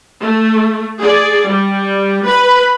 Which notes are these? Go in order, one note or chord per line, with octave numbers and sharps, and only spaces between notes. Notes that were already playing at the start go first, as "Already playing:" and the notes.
A3
G#4 D5
G3
B4 B5